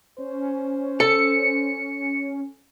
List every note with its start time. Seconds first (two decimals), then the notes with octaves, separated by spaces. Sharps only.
0.18 C#4 C5
1.00 A4 C#7